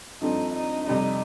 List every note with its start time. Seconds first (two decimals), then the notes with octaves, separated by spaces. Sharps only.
0.21 G2 F3 A3 C4 D#4
0.54 D#4
0.87 F2 C3 G3 D#4